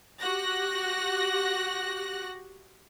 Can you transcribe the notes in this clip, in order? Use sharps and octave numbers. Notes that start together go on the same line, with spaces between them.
F#4 G4 F#6 A#6